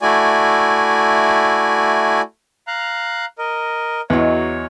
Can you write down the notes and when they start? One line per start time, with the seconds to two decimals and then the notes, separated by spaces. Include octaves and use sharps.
0.02 A3 E4 F#4 D5 G#5
2.67 F5 A#5 F#6
3.38 A#4 D#5
4.10 E2 F#3 G#3 C#5